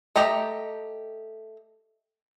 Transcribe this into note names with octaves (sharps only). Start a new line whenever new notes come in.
A3 G4 D#5 A#5